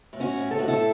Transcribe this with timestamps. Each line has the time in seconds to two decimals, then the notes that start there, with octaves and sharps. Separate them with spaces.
0.13 A2
0.20 C#4 F#4
0.36 A2
0.51 A4
0.59 A2 F#4
0.68 E4 A4